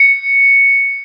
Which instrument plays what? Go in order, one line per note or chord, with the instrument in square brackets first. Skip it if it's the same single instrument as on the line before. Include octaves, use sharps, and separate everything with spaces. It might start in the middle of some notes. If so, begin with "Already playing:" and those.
Already playing: [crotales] C#7